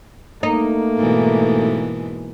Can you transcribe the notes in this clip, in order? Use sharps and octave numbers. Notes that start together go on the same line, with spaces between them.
A3 A#3 D#4
G#2 B2 E3